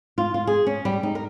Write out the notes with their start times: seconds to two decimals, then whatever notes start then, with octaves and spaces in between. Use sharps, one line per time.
0.18 F4
0.34 F4
0.47 G#4
0.67 C#4
0.85 G3
1.03 D#4
1.15 A#4